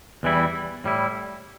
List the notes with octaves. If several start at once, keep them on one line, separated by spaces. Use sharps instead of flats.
E2 E3 G3 E4
A2 G3 E4